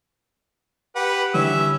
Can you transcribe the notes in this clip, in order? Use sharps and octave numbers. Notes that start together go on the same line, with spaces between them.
G4 B4 F#5
D3 E3 G3 C#4 E5